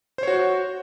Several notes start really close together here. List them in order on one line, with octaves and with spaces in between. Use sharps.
C5 C#5 F#4